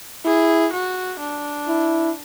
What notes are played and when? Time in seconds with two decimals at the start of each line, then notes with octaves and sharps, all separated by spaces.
0.25 E4 G#4
0.73 F#4
1.20 D4
1.68 E4